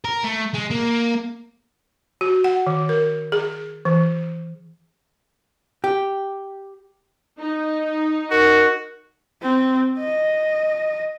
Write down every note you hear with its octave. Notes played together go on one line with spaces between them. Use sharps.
A#4
A3
G#3
A#3
F#4
F#5
D#3
A#4
G#4
E3
G4
D#4
F#4 A#4
C4
D#5